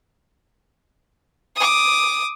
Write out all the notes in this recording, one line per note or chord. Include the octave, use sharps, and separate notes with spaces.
D6 D#6